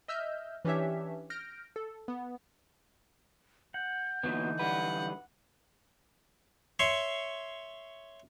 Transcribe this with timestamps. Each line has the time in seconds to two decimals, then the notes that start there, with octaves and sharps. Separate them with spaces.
0.08 D#5 E5 E6 F6 G6
0.65 E3 C#4 D4 G4 C#5 E5
1.30 F6 G6 A#6 D7
1.76 A4
2.08 B3
3.74 F#5 G6
4.23 A#2 D3 E3 F#3 B3 D#4
4.59 F#2 G3 B4 F#5
6.79 C#5 E5 C6 C#6